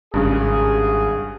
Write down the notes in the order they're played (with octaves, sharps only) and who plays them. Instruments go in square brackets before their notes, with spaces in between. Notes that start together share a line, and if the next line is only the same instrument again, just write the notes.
[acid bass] G#1 [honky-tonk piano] G2 C#3 [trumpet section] G#4